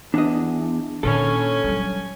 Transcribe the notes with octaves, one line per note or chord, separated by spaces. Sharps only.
E2 D4 D#5
A#2 D#3 C#4 A4 C#5 G#5
F#3 G3